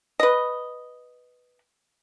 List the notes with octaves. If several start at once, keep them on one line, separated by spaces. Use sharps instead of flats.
B4 D#5